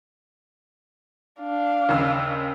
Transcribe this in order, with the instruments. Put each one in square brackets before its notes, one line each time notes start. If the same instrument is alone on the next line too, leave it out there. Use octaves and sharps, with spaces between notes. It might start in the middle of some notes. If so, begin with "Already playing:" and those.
[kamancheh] D4 F5
[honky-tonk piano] D#2 C#3 E6